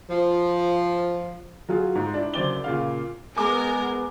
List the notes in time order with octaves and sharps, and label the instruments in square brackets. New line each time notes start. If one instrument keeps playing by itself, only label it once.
[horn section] F3
[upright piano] F#3 F4 G#4
G#2
D4 E4
F#1 F#2 C5 D5 D6 G7
A#2 C#3 F5
[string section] G#3 A#4 [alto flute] B3 [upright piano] G#5 D6